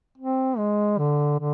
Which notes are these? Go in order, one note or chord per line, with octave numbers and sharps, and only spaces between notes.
C4
G#3
D3
D3